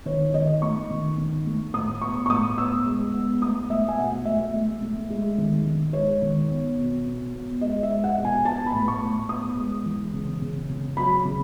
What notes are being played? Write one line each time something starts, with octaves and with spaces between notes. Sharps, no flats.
D#3 C#5
C#5
D#3 D#5
A3 C#6
D#3
D#3
A3
A2 D#6
B3 C#6
C#6
A2 D#6
B3 E6
G#3
B3
A3 D#6
A3 E5
G#5
B2 F#5
A3 E5
A3
A3
G#3
D#3
D#3
G#3 C#5
D#3
B3
B2
B2
B3
G#3 D#5
E5
G#3
F#5
B2
G#5
B3 A5
B5
A2
C#6
A2
B3 D#6
G#3
E3
C#3
C#3
C#3
F#3 B5
C#3